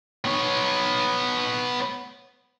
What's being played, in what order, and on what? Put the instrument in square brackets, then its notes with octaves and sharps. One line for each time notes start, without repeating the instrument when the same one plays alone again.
[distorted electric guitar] B3 C#5